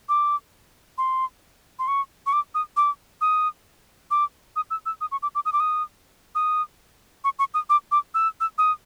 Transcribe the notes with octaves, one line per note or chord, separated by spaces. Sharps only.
D6
C6
C6
C#6
C#6
D6
D#6
D6
D#6
D6
D#6
E6
E6
D#6
C#6
D6
D6
D#6
D6
D#6
D#6
C#6
C#6
D#6
D6
D6
E6
E6
D#6